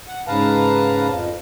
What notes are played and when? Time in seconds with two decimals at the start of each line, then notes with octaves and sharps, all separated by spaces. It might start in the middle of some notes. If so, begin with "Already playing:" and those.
0.08 F#5
0.27 G#2 C#3 B4 F5 A5 A#5
1.09 F2